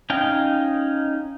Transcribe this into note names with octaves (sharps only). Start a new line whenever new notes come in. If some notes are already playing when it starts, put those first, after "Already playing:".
C#4 D#4 F5 G5